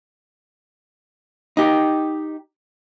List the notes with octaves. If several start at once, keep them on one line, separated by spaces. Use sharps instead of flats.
D#4 G4